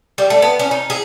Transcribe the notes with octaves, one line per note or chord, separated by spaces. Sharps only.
G3
A3
B3
C#4
D#4
G#4